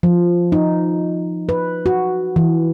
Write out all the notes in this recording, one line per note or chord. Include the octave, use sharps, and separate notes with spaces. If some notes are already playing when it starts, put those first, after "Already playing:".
F3
D#4
B4
F#4
E3